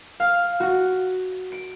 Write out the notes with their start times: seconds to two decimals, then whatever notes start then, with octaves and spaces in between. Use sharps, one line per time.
0.20 F5
0.60 F#4
1.52 D7